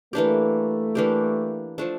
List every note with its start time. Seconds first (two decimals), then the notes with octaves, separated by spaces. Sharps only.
0.13 E3 A3 A#3 D4 G4
0.95 E3 A#3 D4 G4
1.78 F3 A3 D4